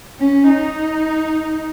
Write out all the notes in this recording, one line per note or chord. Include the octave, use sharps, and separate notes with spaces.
C#4
D#4